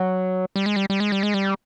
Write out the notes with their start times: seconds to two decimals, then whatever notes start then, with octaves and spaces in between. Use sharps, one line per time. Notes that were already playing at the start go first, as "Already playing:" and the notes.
Already playing: F#3
0.56 G3
0.66 G#3
0.76 G3
0.90 G3
1.00 G#3
1.12 G3
1.23 G#3
1.34 G3